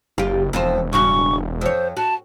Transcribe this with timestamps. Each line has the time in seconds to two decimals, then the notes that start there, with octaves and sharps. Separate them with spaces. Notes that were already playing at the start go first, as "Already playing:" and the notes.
0.18 F#1 F4 G4
0.53 E1 F2 F4 C5
0.93 G2 C#3 F#4 C#6
1.61 F2 C5 C#5
1.97 F#4 A5